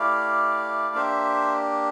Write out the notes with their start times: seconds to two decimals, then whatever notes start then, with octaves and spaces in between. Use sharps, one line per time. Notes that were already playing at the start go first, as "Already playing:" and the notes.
Already playing: A3 E4 G4 D5 F5
0.95 A#3 D4 G4 C5 E5